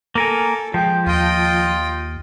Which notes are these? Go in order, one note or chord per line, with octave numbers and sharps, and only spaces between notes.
A#3 A4 A#4 G#5
F3 G#3 G5
D#2 F4 D#5 G5